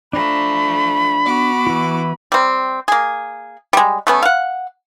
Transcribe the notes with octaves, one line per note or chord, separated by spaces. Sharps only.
F3 A3 D4 A#5 B5
B3 F#4 D6
E3 E4
G3 C4
A#3 G#4
G3 G#3
A3 B3 C#4
F5 F#5